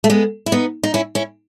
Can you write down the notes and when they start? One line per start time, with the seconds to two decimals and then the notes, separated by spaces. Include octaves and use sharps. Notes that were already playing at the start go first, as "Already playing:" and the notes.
0.04 A3
0.10 G#3 B3
0.46 E4
0.52 B3 D#4
0.83 D#4
0.94 C#4 E4
1.15 C#4 E4